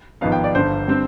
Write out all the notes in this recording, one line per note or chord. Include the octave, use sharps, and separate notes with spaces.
G#1 G#2 F3 B3 D#4 F5
G5
D5
G1 G2 D3 C5
D3 G3 C4